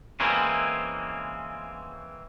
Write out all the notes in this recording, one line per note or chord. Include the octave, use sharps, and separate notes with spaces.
E3 G#3 A#3 C4 C#4